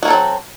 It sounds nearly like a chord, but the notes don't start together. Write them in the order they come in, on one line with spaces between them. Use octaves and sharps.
F#4 A#3 A4 F#3 C4